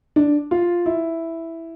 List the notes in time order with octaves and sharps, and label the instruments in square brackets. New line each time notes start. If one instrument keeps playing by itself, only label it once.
[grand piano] D4
F4
E4